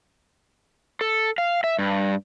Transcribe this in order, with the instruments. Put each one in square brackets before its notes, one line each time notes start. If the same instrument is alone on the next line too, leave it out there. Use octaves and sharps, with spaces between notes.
[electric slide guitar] A4
F5
E5
G2